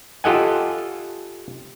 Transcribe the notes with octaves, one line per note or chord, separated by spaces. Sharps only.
F4 G4 A4 D#5 F#5 G#5